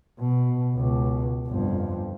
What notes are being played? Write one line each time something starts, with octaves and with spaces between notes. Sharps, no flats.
B2
C#2 B2
G1 F2